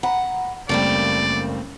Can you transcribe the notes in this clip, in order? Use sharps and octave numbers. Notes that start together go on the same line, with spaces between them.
F#5 A#5 B5
F#1 G3 A3 A#3 C4 D5